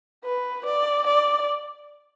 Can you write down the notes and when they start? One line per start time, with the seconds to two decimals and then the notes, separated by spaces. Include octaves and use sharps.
0.25 B4
0.66 D5
1.07 D5